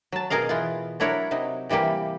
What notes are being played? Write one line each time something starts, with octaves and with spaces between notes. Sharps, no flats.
F#3 A5
B2 G#4 A#4 D#5 F5
E3 B3 F4
F#3 D4 E4 A#4 C#5 F#5
C3 F#3 D#4
C3 E3 G3 A#3 G4